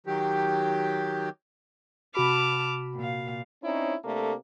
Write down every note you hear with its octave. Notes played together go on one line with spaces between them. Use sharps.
D#3 F#3 G4
C3 F#4 A5 B5 D6 F6
A#2 F5
C4 C#4 D#4 E4 C#5 D5
C3 A3 A#3 D4 A4